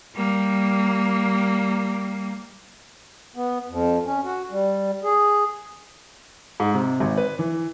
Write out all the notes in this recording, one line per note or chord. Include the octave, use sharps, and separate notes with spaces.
G3 A#3
B3
F2
C#4
F#4
G3
G#4
G#2
C3
G#1
B4
E3